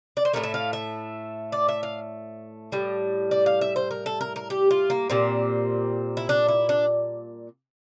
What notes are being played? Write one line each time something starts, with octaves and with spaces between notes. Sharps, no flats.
D5
C5
A2 F3 A3 A#4
E5
F5
E5
D5
E5
F5
A2 G3
D5
F5
E5
C5
A#4
A4
A#4
A#4
G4
F4
A#3
A#2 G3 C4
E4
D4
E4
D4